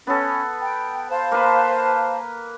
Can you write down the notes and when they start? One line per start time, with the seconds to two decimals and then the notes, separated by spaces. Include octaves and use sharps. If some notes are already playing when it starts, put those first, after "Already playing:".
0.07 B3 C#4 A4
0.62 G5
1.11 C5 F5 A5
1.32 A#3 B4